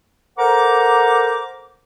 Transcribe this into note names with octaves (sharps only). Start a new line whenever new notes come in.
A4 A#4 C5 F#5 A#5 D6